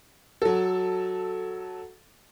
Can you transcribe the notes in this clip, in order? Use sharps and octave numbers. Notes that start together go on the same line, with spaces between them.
F#3 A4